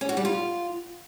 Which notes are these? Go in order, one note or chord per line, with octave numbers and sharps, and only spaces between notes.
C#4
F#4
G3
F4